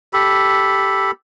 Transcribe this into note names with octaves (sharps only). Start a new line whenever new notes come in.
G4 A4 B5